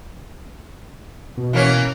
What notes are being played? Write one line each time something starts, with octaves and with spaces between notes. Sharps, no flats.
B2
E3 A#3 C#4